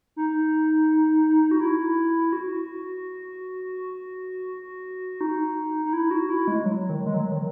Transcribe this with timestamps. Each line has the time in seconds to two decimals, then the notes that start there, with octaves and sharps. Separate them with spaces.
0.16 D#4
1.51 F#4
1.61 E4
2.33 F#4
5.21 D#4
5.85 D#4
5.93 E4
6.11 F#4
6.30 E4
6.48 G#3
6.65 F#3
6.90 D#3
7.07 G#3
7.14 F#3
7.32 D#3